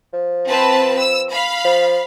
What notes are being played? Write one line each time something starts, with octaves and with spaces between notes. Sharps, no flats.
F3
C4 B4 A5
E6
F5 B5
F3